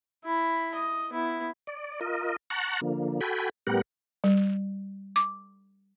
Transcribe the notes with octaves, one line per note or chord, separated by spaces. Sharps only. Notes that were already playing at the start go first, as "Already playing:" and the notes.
E4 B5
D#5
B3 E4
D5
F4 A#4 D#5
F#5 A5 A#5 C#6 F#6
D3 F3 A#3
F#4 A4 G5 G#5 B5
A2 G3 B3 G4 A#4 F#5
G3
D6